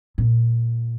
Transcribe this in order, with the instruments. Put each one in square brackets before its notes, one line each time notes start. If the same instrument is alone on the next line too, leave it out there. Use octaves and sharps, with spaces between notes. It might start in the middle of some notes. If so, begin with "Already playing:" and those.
[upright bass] A#2